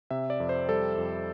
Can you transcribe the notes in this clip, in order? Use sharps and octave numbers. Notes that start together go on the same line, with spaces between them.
C3 E5
D5
F2
C5
G3 A4
F2